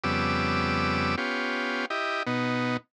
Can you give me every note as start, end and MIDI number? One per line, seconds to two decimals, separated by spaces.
0.04 1.16 41
0.04 1.16 49
0.04 1.16 55
0.04 1.16 59
0.04 1.16 86
0.04 1.16 88
1.18 1.86 59
1.18 1.86 61
1.18 1.86 65
1.18 1.86 67
1.90 2.23 64
1.90 2.23 67
1.90 2.23 75
2.27 2.77 47
2.27 2.77 59
2.27 2.77 63